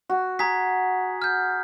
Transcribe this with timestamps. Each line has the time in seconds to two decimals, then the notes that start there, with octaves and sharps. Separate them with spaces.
0.09 F#4
0.39 G#4 A#5 G#6 B6
1.22 F6 G6